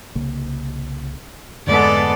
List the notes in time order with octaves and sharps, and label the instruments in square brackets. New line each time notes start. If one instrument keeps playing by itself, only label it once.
[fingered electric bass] C2 C#3 A#3
[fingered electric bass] F2 G#2 D3 [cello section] G#3 B3 A4 [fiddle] D5